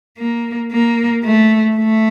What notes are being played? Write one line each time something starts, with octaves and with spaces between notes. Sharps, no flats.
A#3
A#3
A3
A3